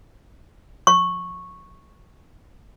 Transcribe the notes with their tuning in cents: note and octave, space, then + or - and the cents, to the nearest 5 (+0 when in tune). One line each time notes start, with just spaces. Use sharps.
C#6 -10